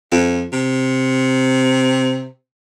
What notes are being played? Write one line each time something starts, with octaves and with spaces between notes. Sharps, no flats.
F2
C3